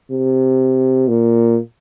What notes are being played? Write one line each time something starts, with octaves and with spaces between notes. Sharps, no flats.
C3
A#2